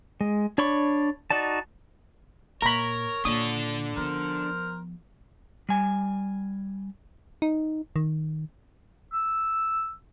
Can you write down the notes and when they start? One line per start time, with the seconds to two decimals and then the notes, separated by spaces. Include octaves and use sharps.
0.21 G#3
0.58 D4 C#5 D5 B5 C#6
1.31 D#4 F#4 D5 A5
2.62 A#2 A#4 C#5 A#5 B5
3.25 A#2 D4 A4 D#6
3.97 F3 B3 A#4 C5
5.69 G3 G#5
7.42 D#4
7.96 D#3
9.13 E6